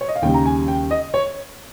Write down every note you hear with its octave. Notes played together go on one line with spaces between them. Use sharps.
C#5
D#5
F5
D#2 C#3 G3 G5
A#5
G#5
G5
D#5
C#5